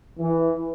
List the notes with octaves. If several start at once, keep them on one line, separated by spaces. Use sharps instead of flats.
E3